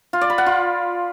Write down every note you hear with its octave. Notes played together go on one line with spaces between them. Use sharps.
F4
D5
B5
F#5
F4